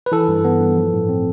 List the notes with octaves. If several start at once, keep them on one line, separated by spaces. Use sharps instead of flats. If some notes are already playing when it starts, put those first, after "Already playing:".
B4
E3 A4
G2
B3
G2
F3
A2
C4